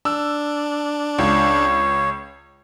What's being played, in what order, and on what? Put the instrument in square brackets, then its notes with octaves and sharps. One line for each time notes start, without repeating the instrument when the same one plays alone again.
[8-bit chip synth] D4 [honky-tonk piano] E6
[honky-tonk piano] C#2 [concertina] C#5